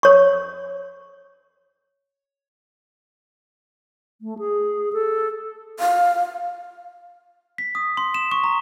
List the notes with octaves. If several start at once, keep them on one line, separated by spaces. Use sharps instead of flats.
C#5 C#6
A3
G#4
A4
F5
B6
D#6
C6
E7
C#6
A#5